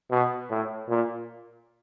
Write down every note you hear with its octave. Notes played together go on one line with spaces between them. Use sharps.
B2
A2
A#2